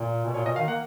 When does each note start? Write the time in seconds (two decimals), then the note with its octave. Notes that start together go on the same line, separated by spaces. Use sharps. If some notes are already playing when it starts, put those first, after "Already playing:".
Already playing: A#2
0.26 B2
0.34 A#2 C#5
0.46 B2 D#5
0.56 D#3 F5
0.67 A#3 F#5